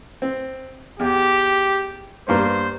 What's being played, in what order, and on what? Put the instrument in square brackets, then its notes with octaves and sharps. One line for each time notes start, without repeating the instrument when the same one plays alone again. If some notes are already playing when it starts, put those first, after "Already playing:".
[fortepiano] C4
[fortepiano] E2 [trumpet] G4
[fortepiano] G2 A#3 B3 [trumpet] C5